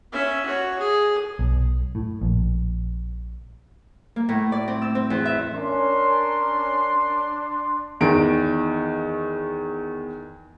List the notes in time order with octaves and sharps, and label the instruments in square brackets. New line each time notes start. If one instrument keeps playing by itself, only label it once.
[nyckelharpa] C#4 E5
F#4 C#5
G#4
[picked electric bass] B1
A2
A#1
[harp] A#3
A2
D5
C4
E6
C4
E2
E5
[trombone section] C#4 A#4 [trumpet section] D4 C6
[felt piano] E2 D#3 D7